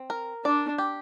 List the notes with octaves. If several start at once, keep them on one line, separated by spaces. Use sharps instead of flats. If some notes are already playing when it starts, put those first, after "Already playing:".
Already playing: C4
A#4
D4 D5
G4